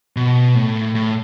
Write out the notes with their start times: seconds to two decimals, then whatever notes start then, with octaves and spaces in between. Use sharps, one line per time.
0.16 B2
0.55 A2
0.95 A2